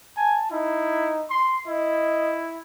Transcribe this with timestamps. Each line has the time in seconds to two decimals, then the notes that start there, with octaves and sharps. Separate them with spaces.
0.17 G#5 A5
0.51 D#4 E4
1.30 C6
1.67 E4 D#5